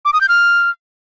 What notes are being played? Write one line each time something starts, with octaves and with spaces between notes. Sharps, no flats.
D6
D#6
G6
F6